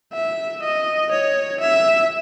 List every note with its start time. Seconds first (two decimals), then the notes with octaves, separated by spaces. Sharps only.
0.13 E5
0.62 D#5
1.12 C#5
1.60 E5